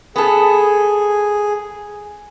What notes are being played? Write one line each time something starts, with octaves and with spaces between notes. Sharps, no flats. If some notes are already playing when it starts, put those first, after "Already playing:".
B3 G#4 A4